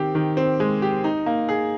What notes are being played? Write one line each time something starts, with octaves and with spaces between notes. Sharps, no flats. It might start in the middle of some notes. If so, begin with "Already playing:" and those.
Already playing: D#3 C4 G4
D#3
C4
G#3
G4
D#4
A#3
G#4